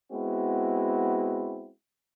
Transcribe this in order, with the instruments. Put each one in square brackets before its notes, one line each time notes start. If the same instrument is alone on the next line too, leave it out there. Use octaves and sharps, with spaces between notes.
[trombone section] G#3 B3 C4 E4 F#4